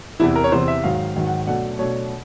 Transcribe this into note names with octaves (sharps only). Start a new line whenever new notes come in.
E2 C3 E3 E4
A#4
C#5
E2 C3 E3 C5
E5
G#2 D#3 F#3 F5
G#2 D#3 F#3
F#5
B2 F#3 A3 D4 F#5
B2 F#3 A3 D4 C#5